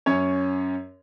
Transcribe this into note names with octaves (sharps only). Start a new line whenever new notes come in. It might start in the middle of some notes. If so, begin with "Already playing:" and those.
F#2 C#4 C#5